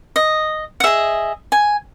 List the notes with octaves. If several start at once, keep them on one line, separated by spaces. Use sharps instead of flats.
D#5
F#5
G#4 D#5 E5
G#5